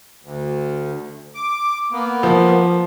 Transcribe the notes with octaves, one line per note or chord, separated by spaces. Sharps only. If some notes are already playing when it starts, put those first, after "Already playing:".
D2
D6
A#3 B3
F3